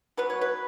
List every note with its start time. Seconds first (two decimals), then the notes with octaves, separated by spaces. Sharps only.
0.17 B2 F#3 B3 B4
0.30 C#5
0.41 B4